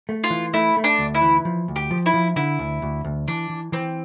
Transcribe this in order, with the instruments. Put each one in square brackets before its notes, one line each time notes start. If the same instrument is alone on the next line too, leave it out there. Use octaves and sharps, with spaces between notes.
[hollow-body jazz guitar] A3
[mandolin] F4
[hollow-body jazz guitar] E3
[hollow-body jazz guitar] A3 [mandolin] E4
[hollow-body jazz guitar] A3
[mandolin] D4
[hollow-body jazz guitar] D2
[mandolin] E4
[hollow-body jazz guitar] E3
F3
D2
[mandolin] G4
[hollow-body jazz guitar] F3
[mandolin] E4
[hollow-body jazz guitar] F3
[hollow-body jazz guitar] D3 [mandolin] E4
[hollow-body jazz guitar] D2
D2
D2
[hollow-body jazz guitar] E3 [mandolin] D4
[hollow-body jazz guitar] E3
[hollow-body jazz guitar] E3 [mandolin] C4